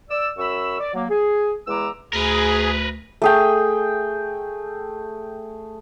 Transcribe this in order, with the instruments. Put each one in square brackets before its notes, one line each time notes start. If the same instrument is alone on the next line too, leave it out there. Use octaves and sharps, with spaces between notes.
[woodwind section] D5 E6
F#2 B5 C#6 E6
D5
F#3 A#3
G#4
E2 G#3 E4 A#5 D6 E6
[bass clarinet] D2 [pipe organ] G#4 [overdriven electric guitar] A#4 B4
[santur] A3 G#4 G5